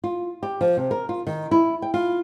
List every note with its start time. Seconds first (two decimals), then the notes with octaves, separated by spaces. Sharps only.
0.04 F4
0.43 G4
0.61 F3
0.77 C3
0.91 A#4
1.09 F4
1.27 D#3
1.51 E4
1.82 G5
1.94 F4